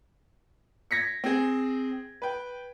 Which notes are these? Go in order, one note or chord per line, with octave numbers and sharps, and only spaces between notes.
G#6 A#6 B6 C#7
C4 G#4
B4 G5